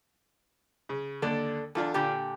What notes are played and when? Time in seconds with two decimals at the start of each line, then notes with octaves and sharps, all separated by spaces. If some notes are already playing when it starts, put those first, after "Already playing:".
0.89 C#3
1.22 D#2 D3 A4 D5
1.75 E2 D4 F4 A4
1.94 A#2 D3 G4